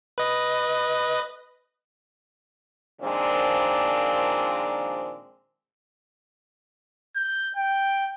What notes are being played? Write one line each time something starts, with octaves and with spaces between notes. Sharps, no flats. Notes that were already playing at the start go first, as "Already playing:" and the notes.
B4 D#5
A#2 D#3 F3 G#3 C4 D4
G6
G5